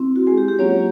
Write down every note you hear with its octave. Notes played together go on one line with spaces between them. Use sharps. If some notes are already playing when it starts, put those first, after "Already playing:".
Already playing: C4 E4
F#4
G#3 G#4
G4
G4
F#3 A#3 C#4 F4 C#5